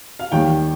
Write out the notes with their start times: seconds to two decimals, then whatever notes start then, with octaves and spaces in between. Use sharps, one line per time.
0.19 F5
0.32 D#2 D#3 G3 G5